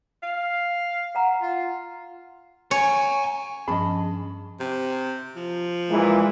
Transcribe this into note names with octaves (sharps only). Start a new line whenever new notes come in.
F5
F#5 A#5
F4
C#5 F#5 G#5
G2 F3 C#4 G#4 D#5 A5 B5
C3
F3
A#2 E3 G#3